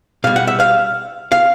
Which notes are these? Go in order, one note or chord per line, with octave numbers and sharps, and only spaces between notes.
B2 G3 F5
F#5
E5
F5
F5